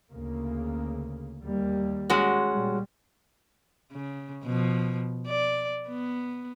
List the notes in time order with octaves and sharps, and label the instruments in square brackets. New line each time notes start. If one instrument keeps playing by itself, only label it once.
[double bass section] D2 C#3 A#3
D#2 G3 A#3
[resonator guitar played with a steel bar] G#3 C#4 F#4
[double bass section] A#2 G3
[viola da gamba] C#3
B2 F3
D5
B3